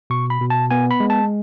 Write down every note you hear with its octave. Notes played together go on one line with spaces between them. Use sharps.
B2 C#6
B5
B2
A5
B3 G#5
B5
G#3
A5